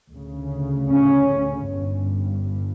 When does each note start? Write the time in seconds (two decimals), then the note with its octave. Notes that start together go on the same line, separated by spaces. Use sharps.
0.12 D2 C#3
0.91 C#4
1.70 G1 G2